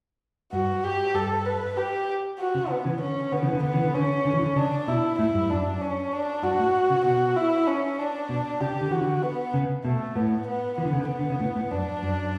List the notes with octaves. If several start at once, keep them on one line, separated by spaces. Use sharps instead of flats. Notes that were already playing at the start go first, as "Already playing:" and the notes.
G2 F#4
G4
G2 A4
B4
G4
F#4
C#3
B3
C#3 E3
D3 C#4
D3 B3
C#3 E3
D3
D3 B3
C#3 E3
D3
D3 C#4
D3
E3
D3
C#3 D4
B2 E4
A2 E4
G2
F#2 D4
C#4
D4
G2 F#4
A2
C#3
B2 F#4
E4
C#4
D4
B2
C#3 G4
D3
E3 F#4
D3
B3
C#3
B2 A3
A2 B3
B3
E3 B3
D3
C#3
D3
B3
D3
C#3
A2
A2
F#2 D4
F#2